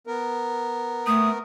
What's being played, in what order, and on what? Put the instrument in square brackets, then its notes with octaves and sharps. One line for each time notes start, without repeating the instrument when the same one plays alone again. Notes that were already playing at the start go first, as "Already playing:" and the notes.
[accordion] B3 A#4
[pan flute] A3 [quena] D#6